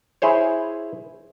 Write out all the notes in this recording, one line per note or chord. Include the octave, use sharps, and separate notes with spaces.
E4 G#4 C5 C#5